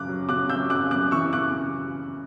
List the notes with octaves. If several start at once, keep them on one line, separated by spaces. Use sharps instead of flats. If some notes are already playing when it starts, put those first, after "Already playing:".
Already playing: F#2 C#3 D6 F#6
F#3
C#3 D6 F#6
F#3 E6 G6
F#2 D6 F#6
F#2 D6 F#6
E3 C#6 E6
C#3 D6 F#6